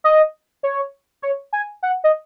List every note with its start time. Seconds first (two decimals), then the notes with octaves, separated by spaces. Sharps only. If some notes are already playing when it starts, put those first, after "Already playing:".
0.04 D#5
0.63 C#5
1.22 C#5
1.53 G#5
1.83 F#5
2.04 D#5